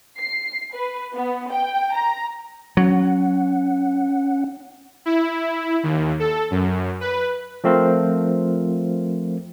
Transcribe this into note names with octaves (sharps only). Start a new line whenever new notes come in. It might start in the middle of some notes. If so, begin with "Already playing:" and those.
C7
B4
B3
G5
A#5
F#3 C#4 F#5
E4
D#2
A4
F#2
B4
F3 A3 C4 F4 A#4